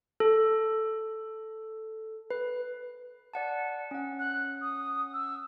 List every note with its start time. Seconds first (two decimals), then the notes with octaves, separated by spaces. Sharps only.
0.20 A4
2.30 B4
3.34 D5 F#5 A5
3.91 C#4 F#5
4.19 F#6
4.62 D#6
5.14 E6